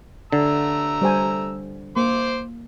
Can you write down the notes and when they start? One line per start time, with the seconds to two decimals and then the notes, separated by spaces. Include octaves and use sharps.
0.32 D3 A3 A#5 E6
1.02 G3 C5 G#5
1.97 A#3 C5 C6 D6